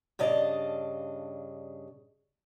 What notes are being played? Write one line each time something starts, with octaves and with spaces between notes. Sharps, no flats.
G2 C#3 D4 D#5 A5